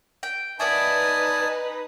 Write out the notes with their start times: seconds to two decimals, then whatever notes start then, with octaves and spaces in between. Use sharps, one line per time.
0.23 G5
0.60 B3 D#4 B4 D5 E5 G#5 A5 D#6